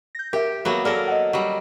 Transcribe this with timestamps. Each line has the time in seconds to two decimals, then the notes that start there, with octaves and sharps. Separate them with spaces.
0.15 G6 A#6
0.33 G4 A#4 E5
0.65 F#3 A#3 B3
0.85 A#3 A4 A#4 D5 F6
1.08 D#5 F#5
1.33 F#3 G3